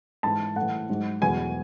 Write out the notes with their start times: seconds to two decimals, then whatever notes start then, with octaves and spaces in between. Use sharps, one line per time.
0.23 G#2 E3 A5
0.56 A2 F#5
0.61 E3
0.89 G#2 F#3
1.21 E2 B2 F#3 G#5